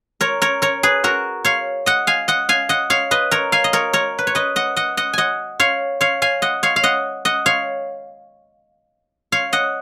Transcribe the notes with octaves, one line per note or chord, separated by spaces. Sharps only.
A#4 C#5
A#4 C#5
A#4 C#5
G#4 B4
F#4 A#4
C#5 F5
D#5 F#5
F5 G#5
D#5 F#5
F5 G#5
D#5 F#5
C#5 F5
B4 D#5
A#4 C#5
F5 G#5
D#5
A#4 C#5
A#4 C#5
B4
C#5
B4 D#5
D#5 F#5
D#5 F#5
D#5 F#5
D#5 F#5 G#5
C#5 F5
C#5 F5
F5 G#5
D#5 F#5
C#5 F5
F5
D#5 F#5
D#5 F#5
C#5 F5
C#5 F5
D#5 F#5